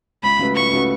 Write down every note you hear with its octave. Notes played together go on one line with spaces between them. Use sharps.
C#2 B5
C#3 A3 F#4 B4
C#2 C#6
C#3 A3 F#4 B4